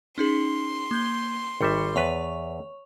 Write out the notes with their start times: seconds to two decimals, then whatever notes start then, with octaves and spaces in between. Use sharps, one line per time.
0.18 C#4 D#4 G#4 C6
0.91 A#3 G6 G7
1.61 G#1 D#3 G3 E5 C#7
1.96 E2 B4 C#5 A5 C#6 F7